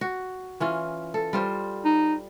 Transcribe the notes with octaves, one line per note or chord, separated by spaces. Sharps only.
F#4
E3 C#4 F4
A4
G3 F4 C5
D#4